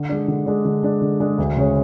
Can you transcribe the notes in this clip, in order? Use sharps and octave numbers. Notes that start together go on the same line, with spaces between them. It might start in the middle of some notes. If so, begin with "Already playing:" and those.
Already playing: D3
G#3 D4
D3
G#3 D4
D3
G#3 D4
D3
G#3 D4
D2
C#3 G#3 C#4